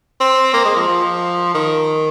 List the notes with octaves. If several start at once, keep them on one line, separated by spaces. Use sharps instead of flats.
C4
A#3
G#3
F3
F3
D#3